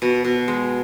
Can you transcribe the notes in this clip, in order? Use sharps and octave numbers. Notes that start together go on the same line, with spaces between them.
B2
B2
G#3